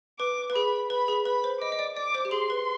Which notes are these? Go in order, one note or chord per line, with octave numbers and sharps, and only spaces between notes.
B4 D6
B4
G#4 B5
B4 B5
G#4
B4 B5
C5
D#5 D6
D#5
D5
D5 D6
C5
G4
G#4 C6
B4